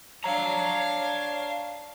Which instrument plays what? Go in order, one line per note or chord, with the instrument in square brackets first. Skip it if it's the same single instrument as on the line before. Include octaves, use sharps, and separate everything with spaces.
[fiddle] D4 F5 [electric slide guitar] C#5 A#5